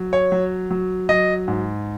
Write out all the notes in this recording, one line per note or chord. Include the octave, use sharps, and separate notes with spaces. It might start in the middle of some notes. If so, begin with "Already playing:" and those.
Already playing: F#3
C#5
F#3
F#3
F#3 D#5
G#2